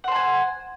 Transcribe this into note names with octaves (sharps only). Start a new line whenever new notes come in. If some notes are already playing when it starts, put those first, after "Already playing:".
C5 F#5 G#5 A5